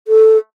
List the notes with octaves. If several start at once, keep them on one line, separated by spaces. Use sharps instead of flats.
A4